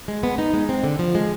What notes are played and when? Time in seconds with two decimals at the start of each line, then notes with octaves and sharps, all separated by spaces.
0.08 G#3
0.23 B3
0.38 D#4
0.54 G#3
0.69 C4
0.84 D3
0.99 F3
1.15 G#3